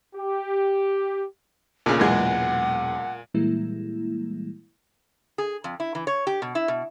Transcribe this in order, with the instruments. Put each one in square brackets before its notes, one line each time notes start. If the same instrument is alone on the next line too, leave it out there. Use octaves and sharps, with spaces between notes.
[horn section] G4
[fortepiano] D2 C#3 [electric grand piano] A#2
[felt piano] E1 F#3 G#6 [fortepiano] C#2 E3 G#3 [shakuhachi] F#5
[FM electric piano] A#2 E3 G3 G#3 A#3 E4
[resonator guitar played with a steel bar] G#4
F2
E4
E3
C#5
G4
B2
E4
B2